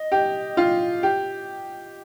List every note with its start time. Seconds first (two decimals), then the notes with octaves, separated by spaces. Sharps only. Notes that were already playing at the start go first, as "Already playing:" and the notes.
Already playing: D#5
0.12 G4
0.57 F4
1.03 G4